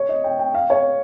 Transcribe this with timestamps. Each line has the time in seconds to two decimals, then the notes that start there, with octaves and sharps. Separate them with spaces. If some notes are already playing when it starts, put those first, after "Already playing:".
Already playing: C#5
0.09 D#5
0.24 G5
0.39 G5
0.54 F5
0.70 C#5